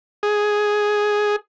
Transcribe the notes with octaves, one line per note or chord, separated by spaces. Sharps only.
G#4